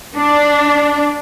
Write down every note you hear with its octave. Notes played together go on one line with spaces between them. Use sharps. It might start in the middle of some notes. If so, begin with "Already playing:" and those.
D4